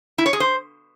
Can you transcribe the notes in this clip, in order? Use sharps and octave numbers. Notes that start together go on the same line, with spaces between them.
E4
C#5
G#4
C5